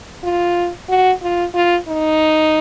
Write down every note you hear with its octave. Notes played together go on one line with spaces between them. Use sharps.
F4
F#4
F4
F4
D#4